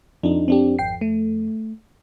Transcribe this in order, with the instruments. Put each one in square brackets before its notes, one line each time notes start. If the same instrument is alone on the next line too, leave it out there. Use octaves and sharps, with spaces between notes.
[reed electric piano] F2 [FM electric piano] D4 D#4
[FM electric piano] C4 D4 G4
G#1 G5 C7
A3